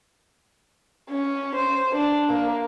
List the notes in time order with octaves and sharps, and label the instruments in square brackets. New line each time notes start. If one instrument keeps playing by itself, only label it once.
[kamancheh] C#4
C5
D4
A#3